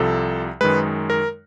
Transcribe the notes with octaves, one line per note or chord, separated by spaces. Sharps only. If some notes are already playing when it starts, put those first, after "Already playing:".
Already playing: C2 C3 F3 A4
F#2 D#3 G#3 B4
A#4